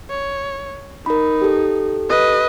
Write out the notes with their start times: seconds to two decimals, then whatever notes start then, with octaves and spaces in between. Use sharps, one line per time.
0.10 C#5
1.06 D#4 A#4 B5
1.42 G4 A4
2.10 B4 D#5